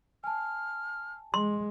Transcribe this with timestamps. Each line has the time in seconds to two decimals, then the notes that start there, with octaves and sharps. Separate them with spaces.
0.24 G#5 A5 F6
1.34 G#3 C6